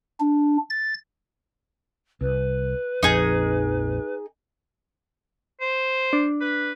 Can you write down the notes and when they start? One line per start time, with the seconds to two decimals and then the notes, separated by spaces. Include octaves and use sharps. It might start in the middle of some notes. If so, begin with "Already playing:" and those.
0.20 D4
0.70 A6
2.21 C2 B4
3.03 A#1 F2 D#4 G#4
5.61 C5
6.13 D4
6.41 B4